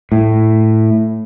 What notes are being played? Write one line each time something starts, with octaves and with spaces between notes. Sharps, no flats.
A2